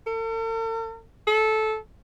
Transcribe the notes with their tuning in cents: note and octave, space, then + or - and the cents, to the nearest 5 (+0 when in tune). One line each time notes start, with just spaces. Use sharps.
A4 +45
A4 -15